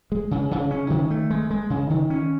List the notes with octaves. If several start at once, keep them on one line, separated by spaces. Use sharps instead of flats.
G#3
C#3
C#3
C#4
D#3
A3
G#3
G#3
C#3
D#3
C#4